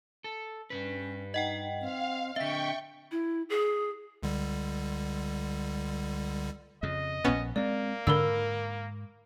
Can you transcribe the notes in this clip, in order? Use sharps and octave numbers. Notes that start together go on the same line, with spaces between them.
A4
G2 B2 C#4 B4
D#4 D#5 F#5 G5
C4 F5
D3 C4 D#5 E5 G5 C#6 B6
E4
G#4
C#2 D3 G3
F2 C#3 D#5
A#1 A#2 B3 C#4
G#3 A#3 C4 D5
G#2 D3 A#4 B5 E6